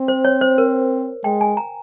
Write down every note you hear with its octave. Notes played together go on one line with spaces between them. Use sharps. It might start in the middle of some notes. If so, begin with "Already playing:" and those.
Already playing: C4
C5
C#5
C5
A#4
G#3 G5
G#5
A#5